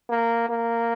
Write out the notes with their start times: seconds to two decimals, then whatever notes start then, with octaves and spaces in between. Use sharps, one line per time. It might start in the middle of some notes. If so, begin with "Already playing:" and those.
0.10 A#3
0.49 A#3